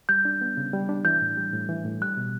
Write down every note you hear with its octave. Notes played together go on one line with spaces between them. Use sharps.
G3 G6
D4
B3
C#3
G3
D4
E3 G6
A2
G3
A2
E3
A2
G3 F#6
B2